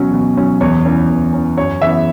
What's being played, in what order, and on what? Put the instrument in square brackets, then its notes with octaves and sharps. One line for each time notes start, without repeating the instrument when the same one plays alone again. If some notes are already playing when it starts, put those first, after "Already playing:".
Already playing: [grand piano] B2 F#3 C#4
B2
F#3 C#4
E2 C#5
E3 C#4
E2
E3 C#4
F#2 C#5
C#3 E3 B3 E5